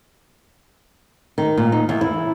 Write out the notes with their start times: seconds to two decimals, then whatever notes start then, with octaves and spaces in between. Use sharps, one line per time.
1.38 D#3
1.57 A#2
1.72 D#4
1.89 E2
2.01 E4